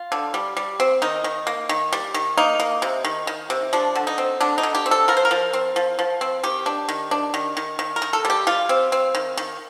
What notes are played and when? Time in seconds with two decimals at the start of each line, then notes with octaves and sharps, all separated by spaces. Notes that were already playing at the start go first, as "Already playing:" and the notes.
Already playing: F4
0.12 D3
0.34 G3
0.57 G3
0.80 C4
1.02 D#3 D#4
1.24 D#3
1.47 A#3
1.69 D#3
1.93 G3
2.14 D#3
2.37 A#3 D#4
2.60 A#3
2.82 C3
3.05 D#3
3.27 D#3
3.50 C3
3.73 F3 D4
3.95 D3
4.07 D#4
4.18 C4
4.40 D3 D4
4.58 D#4
4.63 D3
4.75 G4
4.86 C4
4.91 A4
5.08 F3 A#4
5.17 C5
5.25 A#4
5.31 F3
5.53 C4
5.76 F3
5.99 F3
6.21 C4
6.43 D#3 G4
6.66 D4
6.89 D#3
7.11 D4
7.34 D#3
7.57 D#3
7.79 D#3
7.96 A#4
8.02 D#3
8.13 A4
8.25 G3
8.30 G4
8.47 G3 F4
8.69 C4
8.92 C4
9.15 D#3
9.37 D#3